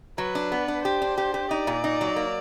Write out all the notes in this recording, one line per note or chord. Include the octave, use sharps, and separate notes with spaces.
F#3 B4
D4
B3
D4
G4 C5
D4
G4
G4
D#4 D5
A#2
D#4
F#3
A#3